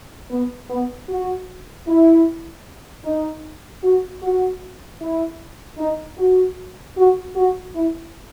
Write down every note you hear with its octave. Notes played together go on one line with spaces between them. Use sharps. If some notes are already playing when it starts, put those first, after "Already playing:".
B3
B3
F#4
E4
D#4
F#4
F#4
E4
D#4
F#4
F#4
F#4
E4